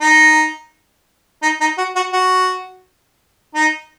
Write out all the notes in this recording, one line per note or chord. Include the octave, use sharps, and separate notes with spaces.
D#4
D#4
D#4
F#4
F#4
F#4
D#4